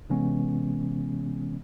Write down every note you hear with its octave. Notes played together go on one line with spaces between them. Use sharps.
C3 E3 G#3 B3 C#4